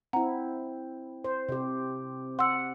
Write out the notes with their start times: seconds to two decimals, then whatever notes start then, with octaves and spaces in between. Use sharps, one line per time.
0.13 C4 E4 F#5 A#5
1.24 C5
1.49 C3 G4
2.39 F#5 C6 E6